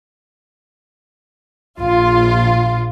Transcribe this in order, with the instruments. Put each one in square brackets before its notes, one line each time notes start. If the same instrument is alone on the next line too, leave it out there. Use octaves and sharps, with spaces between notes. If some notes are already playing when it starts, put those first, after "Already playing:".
[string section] A#1 F4